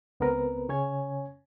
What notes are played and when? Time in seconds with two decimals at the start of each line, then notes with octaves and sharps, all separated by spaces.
0.20 C#2 B3 C4 A#4 B4
0.69 C#3 C#4 C#5 G#5 G#6